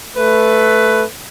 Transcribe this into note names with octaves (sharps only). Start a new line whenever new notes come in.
A3 B4